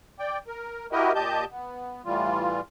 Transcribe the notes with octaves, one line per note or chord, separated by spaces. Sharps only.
D5 G5
A#4
E4 F#4 G4 A#4 D#5
A#2 G4 D#5 A5 G6
B3
A2 E3 G3 F4